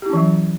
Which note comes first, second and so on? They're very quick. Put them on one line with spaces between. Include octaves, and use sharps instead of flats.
G4 E4 C#4 E3 F#3